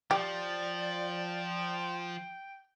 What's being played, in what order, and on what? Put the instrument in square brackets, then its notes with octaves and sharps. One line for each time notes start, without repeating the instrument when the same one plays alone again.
[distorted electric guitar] F3 [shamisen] G4 [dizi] D5 [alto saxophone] G5